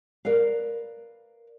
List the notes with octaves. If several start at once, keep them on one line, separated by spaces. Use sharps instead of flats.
A#4 B4 D5 F5